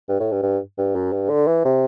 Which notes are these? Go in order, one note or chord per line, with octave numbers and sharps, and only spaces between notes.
G2
A2
G2
G2
G2
F#2
G2
D3
E3
C3